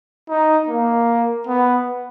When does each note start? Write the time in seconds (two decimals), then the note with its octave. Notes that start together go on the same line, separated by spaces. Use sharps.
0.29 D#4
0.69 A#3
1.47 B3